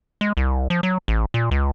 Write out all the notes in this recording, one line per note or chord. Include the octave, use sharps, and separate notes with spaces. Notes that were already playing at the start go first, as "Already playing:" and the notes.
G#3
C2
F3
F#3
A1
A#2
C#2